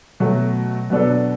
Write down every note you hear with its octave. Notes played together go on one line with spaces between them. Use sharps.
B2 F#3 A3
B2 F#3 B3 D4 A4